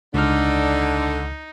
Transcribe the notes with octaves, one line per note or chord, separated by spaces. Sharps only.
C#2 D3 D4 D#4 F6